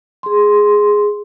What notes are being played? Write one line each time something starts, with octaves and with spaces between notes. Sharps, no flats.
G#4 C6